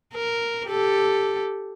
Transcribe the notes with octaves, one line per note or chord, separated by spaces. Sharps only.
A#4
G4 A4